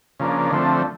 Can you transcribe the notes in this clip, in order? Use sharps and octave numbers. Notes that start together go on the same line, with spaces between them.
C#3 F3 A#3 D4
D3 F3 A3 C4